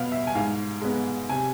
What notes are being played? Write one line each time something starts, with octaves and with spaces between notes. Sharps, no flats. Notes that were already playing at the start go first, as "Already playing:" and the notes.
Already playing: B2 B3 F5
E5
G#5
G#2 F5
G#3 B3
C3 G#5